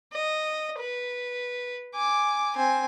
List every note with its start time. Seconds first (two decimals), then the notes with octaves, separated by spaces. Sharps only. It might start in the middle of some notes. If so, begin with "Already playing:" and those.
0.13 D#5
0.79 B4
1.95 G#5 D6
2.55 C4 G#5